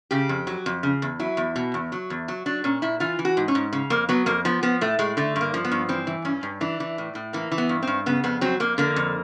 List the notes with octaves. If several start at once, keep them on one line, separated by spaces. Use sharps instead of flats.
C#3 G4
F2
F#3
F2
C#3
E2
F#3 E4
E2
B2
E2
F#3
E2
F#3
F#3 D4
A#2 C#4
A#2 E4
E3 F4
E3
F#4
G#2
C#4
G#2
C#3
F2 A#3
F#3 B3
F2 A#3
F3 B3
F3 B3
A2 A3
A2 G#3
D3 A3
G2
A#3
F3
B3
G2
E3 C4
E3
G2 C#4
G2
E3 D4
E3
A2
A2
E3 A#3
E3
B3
G2
G2 C4
C#3 B3
F2 B3
F#3 C4
F2 A#3
D3 A#3
F2